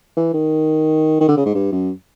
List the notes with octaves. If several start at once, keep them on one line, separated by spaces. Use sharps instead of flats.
E3
D#3
D#3
D3
C#3
G#2
G2
F#2